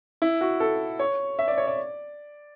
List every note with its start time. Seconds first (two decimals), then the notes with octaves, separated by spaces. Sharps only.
0.22 E4
0.41 F#4
0.60 A4
0.99 C#5
1.39 E5
1.48 D5
1.58 C#5
1.67 D5